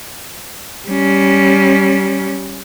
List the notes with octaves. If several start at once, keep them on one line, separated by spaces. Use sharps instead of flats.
G3 C#4